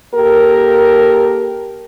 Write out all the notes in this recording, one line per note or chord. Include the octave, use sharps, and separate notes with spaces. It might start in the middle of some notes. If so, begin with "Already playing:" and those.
A#3 G4 A4 A#4